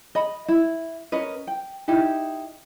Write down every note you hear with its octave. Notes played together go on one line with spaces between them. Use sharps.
D#5 B5
E4
C#4 A#4 B4 D#5
G5
D#4 E4 G4